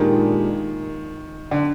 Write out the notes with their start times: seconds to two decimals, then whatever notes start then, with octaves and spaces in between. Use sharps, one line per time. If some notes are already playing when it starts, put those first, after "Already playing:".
Already playing: A#2 D#3 G#3 D4 G4
1.51 D3